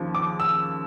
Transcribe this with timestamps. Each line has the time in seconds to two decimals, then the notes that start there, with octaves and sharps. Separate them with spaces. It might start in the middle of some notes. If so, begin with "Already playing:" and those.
Already playing: D#2 C#3 F3
0.15 D6
0.40 E6